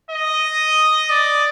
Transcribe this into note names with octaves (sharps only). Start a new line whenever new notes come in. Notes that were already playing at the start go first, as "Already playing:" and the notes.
D#5
D5